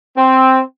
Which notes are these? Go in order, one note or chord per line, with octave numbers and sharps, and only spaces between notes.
C4